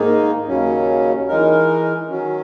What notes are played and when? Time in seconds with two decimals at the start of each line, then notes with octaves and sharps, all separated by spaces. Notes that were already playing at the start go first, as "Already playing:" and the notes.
Already playing: G#2 D#3 A#3 D#4
0.48 D#2 C#3 F#3 C#4
1.28 E3 G#3 D#4 A#4
2.09 D#3 F#3 C#4